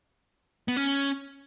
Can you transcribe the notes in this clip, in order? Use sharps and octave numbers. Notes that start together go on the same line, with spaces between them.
B3
C#4